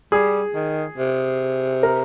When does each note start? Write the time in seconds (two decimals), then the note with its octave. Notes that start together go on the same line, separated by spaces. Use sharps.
0.12 G3 G#4
0.55 D#3
0.98 C3
1.83 A#4